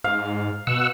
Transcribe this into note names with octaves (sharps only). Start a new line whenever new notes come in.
G#2 F5
B2 F#5 E6